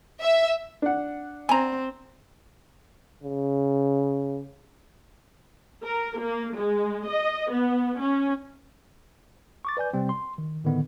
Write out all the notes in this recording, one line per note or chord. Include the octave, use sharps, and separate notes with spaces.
E5
D4 F#5
C4 G#5 A#5
C#3
A#4
A#3
G#3
D#5
B3
C#4
C#6 D6 A6
B4 D5 G#5 G6
C3 G3 C4
C6
D#3
A2 D3 D#3 B3